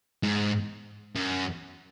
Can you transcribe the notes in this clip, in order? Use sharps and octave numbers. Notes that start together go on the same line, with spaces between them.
G#2
F#2